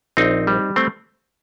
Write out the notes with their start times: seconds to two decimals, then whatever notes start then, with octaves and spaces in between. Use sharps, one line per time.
0.17 A#1 C4 D#4
0.47 G3
0.76 A3 C4